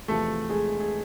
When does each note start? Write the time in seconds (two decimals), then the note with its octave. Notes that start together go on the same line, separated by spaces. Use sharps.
0.08 E2 C3 F3 A3 A4
0.49 G#3 G#4
0.80 G#4